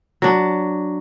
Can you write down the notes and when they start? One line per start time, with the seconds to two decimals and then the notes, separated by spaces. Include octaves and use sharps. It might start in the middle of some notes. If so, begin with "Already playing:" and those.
0.22 F#3 D4